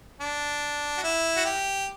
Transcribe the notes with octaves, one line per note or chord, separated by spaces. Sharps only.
D4
F#4
E4
F#4
G4